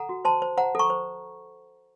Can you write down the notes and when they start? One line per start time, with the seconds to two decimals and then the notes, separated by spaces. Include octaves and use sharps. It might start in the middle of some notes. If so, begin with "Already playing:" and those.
Already playing: A4 F#5 A#5
0.09 F#4
0.25 C5 A5 C6
0.42 C5
0.57 C5 F#5 A#5
0.75 A4 A#5 C#6
0.90 C5